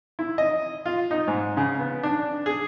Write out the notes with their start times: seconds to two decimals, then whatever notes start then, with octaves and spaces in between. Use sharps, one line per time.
0.19 E4
0.38 D#5
0.86 F4
1.11 D#4
1.28 G#2
1.57 C#3
1.79 B3
2.03 D4
2.46 G#4